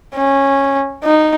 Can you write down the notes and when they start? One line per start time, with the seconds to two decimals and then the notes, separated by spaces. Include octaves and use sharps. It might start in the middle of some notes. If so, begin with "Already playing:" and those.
0.15 C#4
1.04 D#4